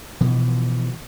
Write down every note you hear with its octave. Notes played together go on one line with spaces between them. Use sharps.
B2 E3 F3